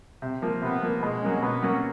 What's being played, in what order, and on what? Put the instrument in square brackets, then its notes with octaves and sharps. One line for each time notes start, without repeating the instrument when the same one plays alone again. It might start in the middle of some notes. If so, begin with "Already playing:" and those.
[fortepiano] C3
F3 A#3
[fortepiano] C3 [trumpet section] B3
[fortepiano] F3 A#3
[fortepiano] B2 [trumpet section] G#3
[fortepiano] F#3 A#3 C#4
[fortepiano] B2 [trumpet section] B3
[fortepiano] F#3 A#3 C#4